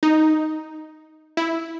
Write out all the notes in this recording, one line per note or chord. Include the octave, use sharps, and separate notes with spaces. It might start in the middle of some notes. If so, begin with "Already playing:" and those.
D#4
E4